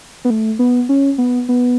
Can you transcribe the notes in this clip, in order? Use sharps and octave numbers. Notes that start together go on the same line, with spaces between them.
B3
A3
B3
C#4
B3
B3